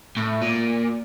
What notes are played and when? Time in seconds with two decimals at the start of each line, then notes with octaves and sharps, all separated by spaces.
0.17 A2
0.42 A#2